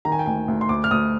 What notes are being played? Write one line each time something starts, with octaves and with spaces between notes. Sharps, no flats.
D#3 A#5
G#5
G5
D2 G#5
D2
C6
D2 D6
F6
D2 D#6